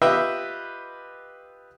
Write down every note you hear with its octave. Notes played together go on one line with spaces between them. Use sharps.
F4 G4 B4 D#5 E5 G5